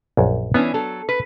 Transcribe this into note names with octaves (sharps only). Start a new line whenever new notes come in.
A#1 F#2
E3 B3 C#4 D4
F#3 A4
B4